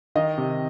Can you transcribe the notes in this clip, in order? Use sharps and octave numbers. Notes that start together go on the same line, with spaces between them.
D#3 D#5
C3